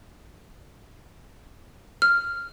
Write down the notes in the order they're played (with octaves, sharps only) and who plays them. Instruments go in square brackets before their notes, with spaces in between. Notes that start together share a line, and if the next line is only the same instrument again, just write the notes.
[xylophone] F6